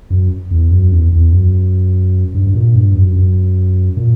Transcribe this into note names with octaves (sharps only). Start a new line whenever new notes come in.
F#2
E2
F#2
E2
E2
F#2
G2
G2
A#2
G2
F#2
F#2
A#2